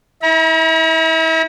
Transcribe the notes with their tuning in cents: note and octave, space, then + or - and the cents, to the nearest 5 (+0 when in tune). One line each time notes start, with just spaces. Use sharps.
E4 -35 A#5 +45